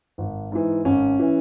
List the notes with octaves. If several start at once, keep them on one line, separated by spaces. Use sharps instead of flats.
G#1
G#2 E3
G#1 C#4
E3